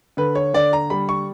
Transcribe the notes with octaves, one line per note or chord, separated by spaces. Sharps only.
D3 B4
C#5
D3 D5
A#5
G3 B5
C#6